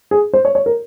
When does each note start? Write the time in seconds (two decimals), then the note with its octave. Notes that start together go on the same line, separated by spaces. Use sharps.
0.11 G#4
0.33 C5
0.45 C#5
0.55 C#5
0.66 A#4